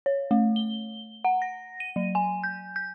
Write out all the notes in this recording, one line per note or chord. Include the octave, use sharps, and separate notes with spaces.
C#5
A3
G7
F#5
A#6
D#7
F#3
G#5
G6
G6